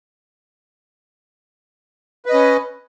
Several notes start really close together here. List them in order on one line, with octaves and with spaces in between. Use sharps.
B4 D#5 C#4